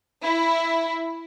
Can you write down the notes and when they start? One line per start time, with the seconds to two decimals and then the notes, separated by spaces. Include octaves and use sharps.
0.24 E4